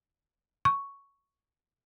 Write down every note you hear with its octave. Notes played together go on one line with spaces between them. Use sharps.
C#6